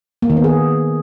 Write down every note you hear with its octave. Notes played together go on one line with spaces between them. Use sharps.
A#3
D#3
B3
G#4